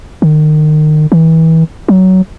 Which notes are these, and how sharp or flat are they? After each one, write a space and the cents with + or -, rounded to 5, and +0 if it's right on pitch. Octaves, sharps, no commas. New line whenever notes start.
D#3 -30
E3 -30
F#3 +15